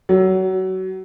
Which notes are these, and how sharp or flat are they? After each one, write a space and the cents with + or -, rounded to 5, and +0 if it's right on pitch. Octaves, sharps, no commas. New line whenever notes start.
F#3 +25